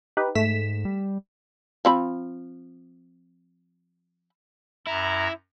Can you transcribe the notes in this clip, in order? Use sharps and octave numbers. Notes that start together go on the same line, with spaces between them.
D#4 G4 B4
G#2 A3 B6 E7
G3
F3 C4 B5
F#2 E4 A#5 A#6